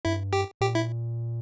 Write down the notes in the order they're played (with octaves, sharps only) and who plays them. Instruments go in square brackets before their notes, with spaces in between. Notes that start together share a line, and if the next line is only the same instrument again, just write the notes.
[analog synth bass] G2 [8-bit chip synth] E4
[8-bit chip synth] G4
[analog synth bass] A#2 [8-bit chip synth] G4
[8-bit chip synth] E4